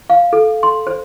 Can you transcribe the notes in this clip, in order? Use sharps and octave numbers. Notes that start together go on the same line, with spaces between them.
F5
A4
C6
C5